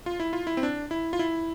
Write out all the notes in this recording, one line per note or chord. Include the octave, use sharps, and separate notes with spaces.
F4
E4
F4
E4
C4
D4
E4
F4
E4